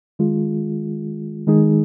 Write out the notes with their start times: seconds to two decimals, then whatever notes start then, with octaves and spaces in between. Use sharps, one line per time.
0.19 D#3 G#3 F4 G#4
1.47 D#3 G#3 D#4 G#4